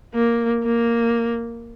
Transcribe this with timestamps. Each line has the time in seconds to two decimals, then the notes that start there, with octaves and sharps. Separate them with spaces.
0.14 A#3
0.63 A#3